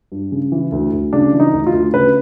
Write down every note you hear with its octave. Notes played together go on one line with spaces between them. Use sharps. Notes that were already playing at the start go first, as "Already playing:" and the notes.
G2
C#3
E3
D2
D2
C#3 D4
E3
D#4
D2
F4
D2
C#3 B4